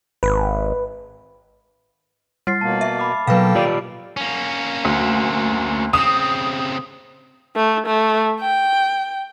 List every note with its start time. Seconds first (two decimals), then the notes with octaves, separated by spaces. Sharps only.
0.23 G#1 B4
2.47 G3 F6 A6 C7
2.61 B2 A#3 A5
2.81 E5
2.99 B5 D6
3.27 B2 F#3 A#3 A4 B4 F5 G5
3.55 F4 G4 D5
4.17 A#3 C#4
4.85 D2
5.93 C#3 C4 D#6
7.56 A3
7.86 A3
8.41 G5